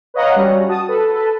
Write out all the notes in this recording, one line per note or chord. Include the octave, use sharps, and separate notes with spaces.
B4 C#5 D#5 F5 F#5 A#5
G3 C#4 F#4 C#5
F#4 A5 D#6
A4 B4
A4 B4 A5